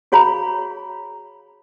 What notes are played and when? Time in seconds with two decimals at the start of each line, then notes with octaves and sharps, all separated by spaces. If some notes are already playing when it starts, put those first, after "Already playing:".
0.12 F#4 G#4 C#5 F5 A#5 B5